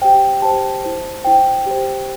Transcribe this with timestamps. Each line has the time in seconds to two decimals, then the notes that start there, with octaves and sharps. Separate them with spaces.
0.02 G4 C5 G5
0.42 G4 C5 A5
0.84 E4 C5
1.25 E4 C5 G5
1.66 G4 C5